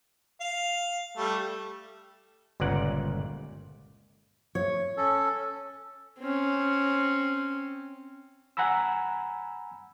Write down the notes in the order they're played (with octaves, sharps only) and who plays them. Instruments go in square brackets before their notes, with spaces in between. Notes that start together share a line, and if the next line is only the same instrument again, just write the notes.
[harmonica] F5
G3 A3
[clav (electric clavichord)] G1 C#2 A#2 D5 F#5
[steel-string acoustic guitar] C#5
[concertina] C#4 A4
[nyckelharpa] C4 C#4
[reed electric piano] F#5 G#5 A#5 B5 E6